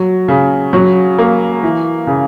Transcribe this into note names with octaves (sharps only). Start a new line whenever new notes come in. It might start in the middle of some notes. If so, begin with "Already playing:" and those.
Already playing: F#3
C#3
F#3
A#3
E3
C#3